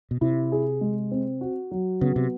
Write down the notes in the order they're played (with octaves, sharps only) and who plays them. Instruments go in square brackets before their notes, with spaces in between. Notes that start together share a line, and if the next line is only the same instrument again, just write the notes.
[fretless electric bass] B2
[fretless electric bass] C3 [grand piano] E4
[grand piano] G#4
G#3
C4
F#4
F#3
[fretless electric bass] C#3 [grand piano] B3
[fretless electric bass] C3